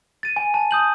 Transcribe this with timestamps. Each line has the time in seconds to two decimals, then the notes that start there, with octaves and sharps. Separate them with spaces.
0.23 A6 D#7
0.36 G#5
0.54 A5
0.71 D#6 G6 F#7